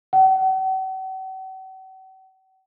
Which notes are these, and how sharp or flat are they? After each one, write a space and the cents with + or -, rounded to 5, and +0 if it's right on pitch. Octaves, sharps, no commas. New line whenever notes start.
F#5 +45